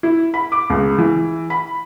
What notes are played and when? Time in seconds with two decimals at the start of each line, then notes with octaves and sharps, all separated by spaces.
0.03 E4
0.34 B5
0.52 D6
0.70 C#2
0.98 E3
1.50 B5